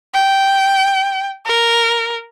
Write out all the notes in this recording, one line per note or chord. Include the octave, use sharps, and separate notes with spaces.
G5
A#4